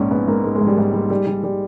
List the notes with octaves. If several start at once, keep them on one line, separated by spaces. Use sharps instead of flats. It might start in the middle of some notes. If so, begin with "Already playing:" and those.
Already playing: A#1 G#2 C#4
G#2 B3
G#2 A#3
G#2 G#3
G#3
G#2
G3
G#2 G#3
G3
G3
G3
G3